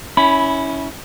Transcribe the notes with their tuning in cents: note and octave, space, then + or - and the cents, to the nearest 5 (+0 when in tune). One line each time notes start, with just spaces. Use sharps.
C#4 +10 E4 -20 B5 +0